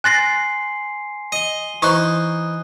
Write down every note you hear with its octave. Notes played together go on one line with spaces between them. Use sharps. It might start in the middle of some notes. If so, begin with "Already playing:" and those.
G#5 C6 F#6 A6 A#6 C7
D#5 D#7 G7
E3 D#4 C5 C#6 D#6 F#6